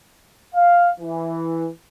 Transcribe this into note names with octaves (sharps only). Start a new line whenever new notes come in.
F5
E3